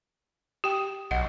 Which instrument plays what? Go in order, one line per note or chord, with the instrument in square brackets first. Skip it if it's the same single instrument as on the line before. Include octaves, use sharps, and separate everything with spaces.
[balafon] G4 G5
[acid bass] B1 [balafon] D#5 F#5